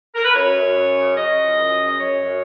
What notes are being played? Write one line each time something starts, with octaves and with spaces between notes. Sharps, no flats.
A#4
B4
F#2 C#5
F#2
F#2
C#3
C#3 D#5
F3
F#2
C#3
D#5
F#2 C#5
F#2